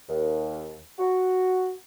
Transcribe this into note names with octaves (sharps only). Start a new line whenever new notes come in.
D#2
F#4